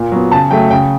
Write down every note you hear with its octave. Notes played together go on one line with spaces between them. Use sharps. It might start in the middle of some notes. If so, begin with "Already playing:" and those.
Already playing: A#2
F#3 B3
C#3 A5
F#3 A3 G5
C#3 G5